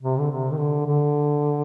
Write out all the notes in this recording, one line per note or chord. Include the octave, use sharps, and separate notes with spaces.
C3
D3
C3
D#3
D3
D3